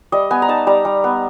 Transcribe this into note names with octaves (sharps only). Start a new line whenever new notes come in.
G3 D#5
B3 G#5
A#5
D#4 A5
G3 A#5
G3
B3